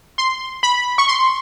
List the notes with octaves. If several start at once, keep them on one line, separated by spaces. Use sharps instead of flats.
C6
B5
C#6
C6